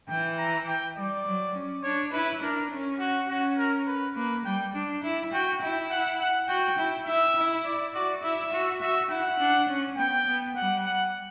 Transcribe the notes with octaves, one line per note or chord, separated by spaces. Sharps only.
E3 G5
A#5
G5
G3 D5
F#3
C#4
D4 C#5
E4 B4
D4 A#4
C#4
F#4
C#4 F#4
A#4
B4
A#3 B4
G3 G5
D4
E4
F#4 G5
E4 G5
F#5
F#5
F#4 G5
E4
E4 E5
E4
D5
F#4 D5
E4 E5
F#4
F#4 E5
E4 F#5
D4
C#4
B3 G5
B3
G3 F#5
F#5